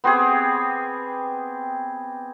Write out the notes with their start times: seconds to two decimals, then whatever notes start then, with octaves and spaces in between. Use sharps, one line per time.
0.04 B3 C4 G4 G#4